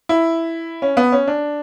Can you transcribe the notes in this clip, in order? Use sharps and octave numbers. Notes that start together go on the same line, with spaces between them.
E4
C#4
B3
C#4
D4